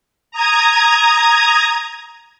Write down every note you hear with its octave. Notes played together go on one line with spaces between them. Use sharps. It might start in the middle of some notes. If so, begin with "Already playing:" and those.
A#5 D#6 G#6